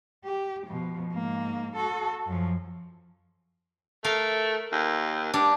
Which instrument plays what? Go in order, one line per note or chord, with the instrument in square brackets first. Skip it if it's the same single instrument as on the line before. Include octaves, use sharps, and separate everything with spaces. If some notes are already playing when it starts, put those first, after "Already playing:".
[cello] G4
B2 F3
G#2 A#3
F#4 A4
F#2 F3
[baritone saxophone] A3 [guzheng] A#4 F5
[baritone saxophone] D#2
[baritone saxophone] G2 [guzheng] D4